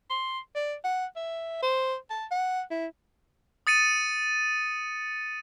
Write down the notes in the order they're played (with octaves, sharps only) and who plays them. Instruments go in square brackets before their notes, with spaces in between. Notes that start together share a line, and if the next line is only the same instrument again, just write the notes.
[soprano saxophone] C6
D5
F#5
E5
C5
A5
F#5
E4
[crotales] D#6 A6 C#7 D#7